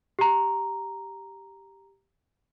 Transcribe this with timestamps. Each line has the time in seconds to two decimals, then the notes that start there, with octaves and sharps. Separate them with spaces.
0.19 G4 A#5